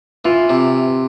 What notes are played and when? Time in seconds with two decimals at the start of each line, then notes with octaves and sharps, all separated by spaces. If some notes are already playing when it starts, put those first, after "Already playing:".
0.25 E3 F4
0.50 C3